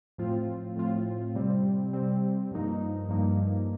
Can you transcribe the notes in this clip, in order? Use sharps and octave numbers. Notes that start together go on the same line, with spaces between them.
A2 F3 C4 F4
A2 F3 C4 F4
C3 G3 C4
C3 G3 C4
G2 F3 A#3 D#4
G2 F3 A#3 D#4